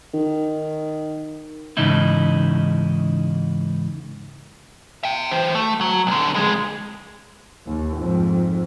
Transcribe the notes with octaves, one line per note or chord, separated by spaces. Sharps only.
D#3
E2 G#2 C#3 D#4 E4
E5 G5
E3 C5
A3
F#3
B1 D3
F2 G#3
D#2
F2 G#2